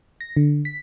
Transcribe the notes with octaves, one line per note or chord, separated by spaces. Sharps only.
A#6
D3
B6